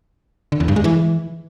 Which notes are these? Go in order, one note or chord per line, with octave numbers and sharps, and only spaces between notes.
D3
E2
G2
G#3
E3